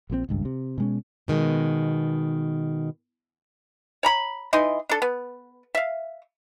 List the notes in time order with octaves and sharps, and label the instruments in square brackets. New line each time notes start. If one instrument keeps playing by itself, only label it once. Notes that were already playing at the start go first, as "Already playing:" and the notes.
[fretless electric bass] A#1 A#2 D3 C4
G#1 C#2 G2
C3
B2 G#3 C#4
[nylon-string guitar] B2 D#3 G#3
[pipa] C#5 A#5 B5
E3 D#4 D#5 C6
D4 A4
B3
E5 F5